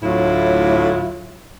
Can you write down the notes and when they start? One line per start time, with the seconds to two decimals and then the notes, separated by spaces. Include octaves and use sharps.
0.03 D2 A2 F#3 E4 F4